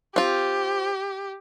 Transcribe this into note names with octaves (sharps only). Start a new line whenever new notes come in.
C4 F4 G4